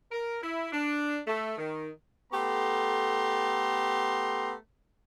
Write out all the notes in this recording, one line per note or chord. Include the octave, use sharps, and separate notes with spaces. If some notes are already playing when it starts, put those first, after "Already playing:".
A#4
E4
D4
A3
D#3
A3 B3 G4 A4 A#5 C6